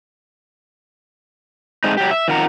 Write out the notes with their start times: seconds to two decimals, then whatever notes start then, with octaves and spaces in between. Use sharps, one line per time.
1.84 G#3 A3 C4 D#4
1.97 F#3 G4
2.11 E5
2.28 F2 D#3 F4 A#4 F#5 A#5